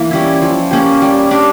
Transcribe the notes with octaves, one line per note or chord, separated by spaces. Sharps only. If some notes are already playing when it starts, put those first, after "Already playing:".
Already playing: E3 A#3
G3 C#4 E4
F3
A#3 C#4 G4
G3
D4 G4 A#4